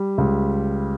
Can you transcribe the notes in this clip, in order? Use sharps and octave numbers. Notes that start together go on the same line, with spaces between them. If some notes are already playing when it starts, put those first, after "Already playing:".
Already playing: G3
C#2